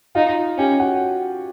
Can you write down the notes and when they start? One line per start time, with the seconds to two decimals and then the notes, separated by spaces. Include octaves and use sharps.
0.15 D#4 F4 F5
0.58 C#4 G4 G5
0.80 F#4 F#5